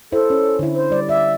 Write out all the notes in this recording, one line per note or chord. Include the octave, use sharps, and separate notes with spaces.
E4 A4 C5
C#4
D3 E4
C5
G3 D5
D5 E5